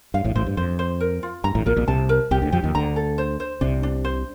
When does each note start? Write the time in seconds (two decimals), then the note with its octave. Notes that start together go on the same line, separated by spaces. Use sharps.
0.14 G2 F5
0.24 A1 A2
0.35 A1 A2 C5
0.46 G2
0.57 F2 C5
0.79 C5
1.00 A#4
1.23 F4
1.44 G2 A#5
1.55 A1 A2
1.66 A#1 A#2 A#4
1.76 A#1 A#2
1.87 C2 C3 A5
2.09 A#4
2.31 C2 C3 G4
2.42 D2 D3
2.52 F2 F3 G4
2.63 D#2 D#3
2.75 D2 D3 A#5
2.96 A4
3.18 C5
3.40 C5
3.61 C2 C3 D4
3.83 D4
4.05 C5